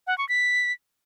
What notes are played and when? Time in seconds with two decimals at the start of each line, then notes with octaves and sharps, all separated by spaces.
0.07 F#5
0.18 C#6
0.29 B6